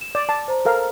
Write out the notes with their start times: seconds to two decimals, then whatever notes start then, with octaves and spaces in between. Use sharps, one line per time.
0.01 E7
0.15 D5 E7
0.29 D5 A5
0.48 C5 A#5
0.65 A4 A#4 F5